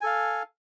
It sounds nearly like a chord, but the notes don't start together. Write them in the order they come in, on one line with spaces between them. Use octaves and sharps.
G#5 A4 F5